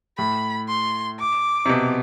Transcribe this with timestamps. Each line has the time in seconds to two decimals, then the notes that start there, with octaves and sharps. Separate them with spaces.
0.18 A2 B5
0.68 C6
1.19 D6
1.66 C3
1.69 B2